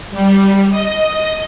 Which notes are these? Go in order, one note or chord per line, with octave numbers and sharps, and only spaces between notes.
G3
D#5